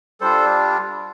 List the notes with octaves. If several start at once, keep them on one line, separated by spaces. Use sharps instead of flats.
G3 D4 F4 A4 C5